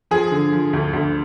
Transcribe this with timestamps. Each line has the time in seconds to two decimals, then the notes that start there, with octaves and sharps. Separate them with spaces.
0.11 F3 G#4
0.31 D3
0.52 F3
0.73 D2
0.93 D2